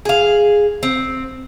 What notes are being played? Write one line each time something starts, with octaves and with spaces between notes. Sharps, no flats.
G#4 F5
C4